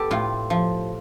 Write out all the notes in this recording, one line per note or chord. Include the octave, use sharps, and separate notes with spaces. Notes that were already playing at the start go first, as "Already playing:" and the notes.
Already playing: B3 G4 A4
A2 F4
F3